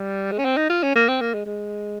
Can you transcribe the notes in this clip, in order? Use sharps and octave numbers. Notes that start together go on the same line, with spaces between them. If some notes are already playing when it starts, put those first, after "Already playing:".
Already playing: G3
G#3
C#4
C4
D#4
F4
C#4
A#3
C4
A#3
G#3
G#3